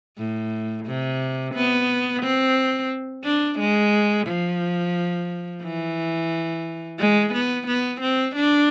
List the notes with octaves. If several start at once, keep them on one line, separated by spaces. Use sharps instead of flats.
A2
C3
B3
C4
D4
G#3
F3
E3
G#3
B3
B3
C4
D4